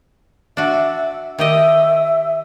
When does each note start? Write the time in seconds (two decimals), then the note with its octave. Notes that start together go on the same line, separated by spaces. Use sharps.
0.57 D4 F#4 E5
1.39 D#3 G4 D#5 E5